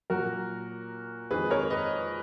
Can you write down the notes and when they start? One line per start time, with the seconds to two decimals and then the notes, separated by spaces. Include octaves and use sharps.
0.10 A#2 F#3 F#4 A#4
1.31 F2 D#3 G#3 G#4 B4
1.50 A#4 C#5
1.70 B4 D#5